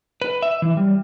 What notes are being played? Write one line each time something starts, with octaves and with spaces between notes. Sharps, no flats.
B4
E5
E3
G3